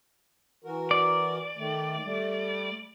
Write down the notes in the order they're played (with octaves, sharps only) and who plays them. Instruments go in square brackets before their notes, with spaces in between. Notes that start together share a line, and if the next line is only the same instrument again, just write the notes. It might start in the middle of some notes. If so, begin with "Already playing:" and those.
[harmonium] E3 F#4 A#4
[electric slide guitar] D5
[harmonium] D#3 A3
G3 A3